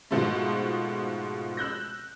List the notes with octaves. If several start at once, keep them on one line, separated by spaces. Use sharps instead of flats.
G#2 B2 F3 G#3 A3
E6 F#6 G6 A#6